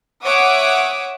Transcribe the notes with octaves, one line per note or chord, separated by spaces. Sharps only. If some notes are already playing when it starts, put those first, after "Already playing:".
C#5 E5 F#5 D6 D#6